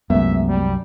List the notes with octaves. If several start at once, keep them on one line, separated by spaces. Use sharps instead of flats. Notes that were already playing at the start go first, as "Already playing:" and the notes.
C2 F#2 G#3 A3 B3 E5
G3